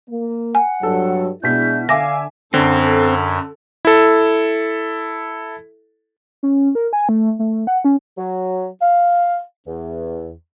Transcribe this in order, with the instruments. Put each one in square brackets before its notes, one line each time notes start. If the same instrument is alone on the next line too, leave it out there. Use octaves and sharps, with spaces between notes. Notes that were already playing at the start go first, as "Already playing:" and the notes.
[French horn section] A#3
[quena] F#5 [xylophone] G#5
[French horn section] G2 F#3 [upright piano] A4
[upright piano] B2 B6 [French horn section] G#3 D4 E4 [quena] G6
[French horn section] D3 [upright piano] E5 G#5 D6 [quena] F5 [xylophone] A#6
[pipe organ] F#2 [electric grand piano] D3 [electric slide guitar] C4 [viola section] A4
[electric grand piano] E4 A4
[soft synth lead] C#4
A#4
G#5
A3
A3
F#5
C#4
[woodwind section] F#3
F5
E2